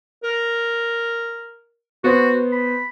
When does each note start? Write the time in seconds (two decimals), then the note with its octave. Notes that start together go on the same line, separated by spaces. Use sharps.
0.23 A#4
2.04 B3 F#4 C5
2.52 B5